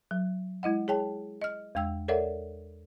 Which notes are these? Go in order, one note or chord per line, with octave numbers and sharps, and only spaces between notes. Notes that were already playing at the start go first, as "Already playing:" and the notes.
F#3
G#3 E4 D#5 F#5
G#4 C#5 G5 A5
D#5 F6
E2 G#3 G5 E6
A4 A#4 C#5 D5 E5 F#5